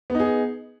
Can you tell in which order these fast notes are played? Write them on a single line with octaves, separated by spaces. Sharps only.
B3 D#4 G#4